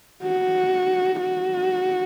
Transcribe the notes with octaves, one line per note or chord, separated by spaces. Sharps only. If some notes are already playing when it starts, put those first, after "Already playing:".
F#4
F#4